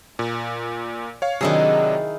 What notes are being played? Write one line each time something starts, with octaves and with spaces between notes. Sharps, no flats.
A#2
C#5 F5
C3 D#3 F#3 D4 E4 G#4